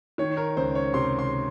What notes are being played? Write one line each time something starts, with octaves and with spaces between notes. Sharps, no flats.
D#3 C#5
A#4
C#2 C5
C#5
C3 C6
C6